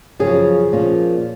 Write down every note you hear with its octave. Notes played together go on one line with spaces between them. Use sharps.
F#2 C#3 F3 G#4
A#2 F3 A#3 C#4